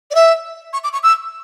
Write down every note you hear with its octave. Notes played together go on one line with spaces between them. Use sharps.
D5
E5
C#6
D6
C#6
E6